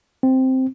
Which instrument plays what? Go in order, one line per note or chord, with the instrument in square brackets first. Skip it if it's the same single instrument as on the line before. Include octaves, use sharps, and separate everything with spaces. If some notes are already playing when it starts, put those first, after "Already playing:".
[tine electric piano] C4